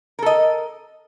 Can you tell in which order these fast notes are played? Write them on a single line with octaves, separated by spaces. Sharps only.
A#4 A4 D#5